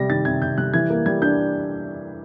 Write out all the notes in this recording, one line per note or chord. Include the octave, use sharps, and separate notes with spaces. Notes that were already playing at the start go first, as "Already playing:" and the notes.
Already playing: C3 G3 A#6
D#3 A6
C3 G#6
C3 G6
G3 F#6
E3 G#6
A#3
G3 G#6
D4 G6